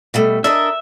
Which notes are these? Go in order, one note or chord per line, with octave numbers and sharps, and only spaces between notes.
B2 G3 A3
D4 A#4 D#5 E5